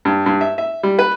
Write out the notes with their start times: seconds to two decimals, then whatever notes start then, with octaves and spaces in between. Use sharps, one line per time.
0.05 G2
0.26 G2
0.41 E5
0.58 E5
0.83 G3
0.99 B4